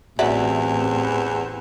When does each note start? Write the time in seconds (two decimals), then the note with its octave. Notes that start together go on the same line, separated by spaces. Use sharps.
0.19 A1 E2 F#3 C4 D5 E5